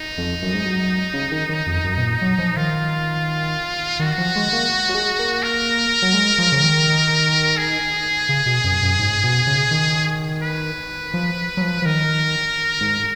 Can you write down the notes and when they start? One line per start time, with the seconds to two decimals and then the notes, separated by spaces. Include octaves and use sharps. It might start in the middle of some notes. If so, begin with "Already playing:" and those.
Already playing: D#4
0.18 F2
0.42 F#2
0.54 G#2
0.65 F#2
1.14 C#3
1.31 D#3
1.49 D#3
1.67 F2
1.85 F#2
1.98 B2
2.02 A#2
2.21 F#3
2.38 F3
2.56 D#3 F4
3.99 D#3 F#4
4.18 F3
4.36 G#3
4.53 A#3
4.89 F#3
4.94 G#3
5.19 A#3
5.43 A#4
6.02 F#3
6.14 G#3
6.38 F3
6.52 C#3
6.62 D#3
7.57 G#4
8.29 C#3
8.46 B2
8.64 F#2
8.83 F#2
8.99 G#2
9.24 B2
9.47 C#3
9.71 D#3
10.42 B4
11.14 F3
11.57 F#3
11.62 F3
11.82 F3
11.85 D#3 A#4
12.81 G#2